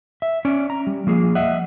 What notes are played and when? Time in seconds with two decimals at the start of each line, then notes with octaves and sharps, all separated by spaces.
0.22 E5
0.45 C#4 D5
0.70 A#5
0.87 G3
1.07 F3 A#3 G#4
1.35 D#5 E5 F#5